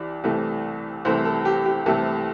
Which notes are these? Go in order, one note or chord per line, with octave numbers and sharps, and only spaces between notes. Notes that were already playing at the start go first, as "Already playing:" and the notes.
Already playing: C2 E3 D5
C2 C3 E3 A3
C2 C3 E3 A3 C5
A4
G4
G4
C2 C3 E3 A3 A4